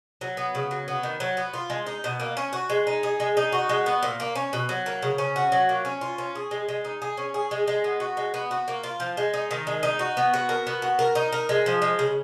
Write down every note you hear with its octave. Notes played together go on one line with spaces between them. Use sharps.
F#3
B3
C#3
F#3
B3
D#3
F#3
B3
F4
G#3
D#4
B2
A#3
C#4
F#4
G#3
D#4
G#4
G#3
D#4
F#4
G#3
B3
A#2
A#3
C#4
B2
F#3
A#3
C#3
C#4
F#4
F#3
A#3
C#4
F4
C#4
G#4
G#3
G#3
D#4
G#4
C#4
G#4
G#3
G#3
B3
F#4
G#3
B3
F#4
A#3
F4
F3
G#3
D#4
D#3
G#3
D#4
F#4
B3
F#4
A#4
B3
F#4
A#4
D#4
A#4
G#3
F3
G#3
C#3